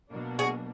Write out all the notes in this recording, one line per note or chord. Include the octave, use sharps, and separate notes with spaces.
B2 F#3 A#3 D4
F#4 G#4